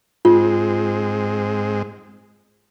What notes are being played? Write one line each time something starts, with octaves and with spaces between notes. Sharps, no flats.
G#2 G#3 C4 F4